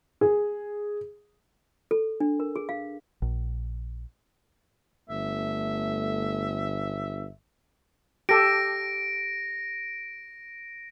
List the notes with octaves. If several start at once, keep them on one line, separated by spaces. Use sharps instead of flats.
G#4
A4
D4
A#4
G#4
F5
A#1
G1 A3 E5
G4 A4 A#6 D7